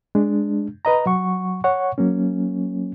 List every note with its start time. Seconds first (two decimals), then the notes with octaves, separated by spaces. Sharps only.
0.15 G#3 D4
0.85 B4 D#5 A#5
1.06 F#3 F#5 C#6
1.64 C#5 F#5 C#6
1.98 F#3 A#3 C#4